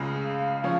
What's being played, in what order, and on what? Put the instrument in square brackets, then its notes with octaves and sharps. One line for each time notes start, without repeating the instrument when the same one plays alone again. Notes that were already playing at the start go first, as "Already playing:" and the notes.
Already playing: [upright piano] C#2 C#3 G#3
[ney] F5
[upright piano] F3 C#4 [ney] F5